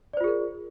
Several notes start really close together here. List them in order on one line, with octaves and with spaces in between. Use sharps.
D5 C5 F4 G#4 A#4